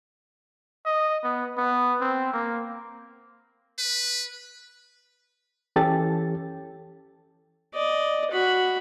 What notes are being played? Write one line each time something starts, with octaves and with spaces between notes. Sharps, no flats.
D#5
B3
B3
C4
A#3
B4
E3 C#4 G4 A4 A6
D5 D#5
F#4 B5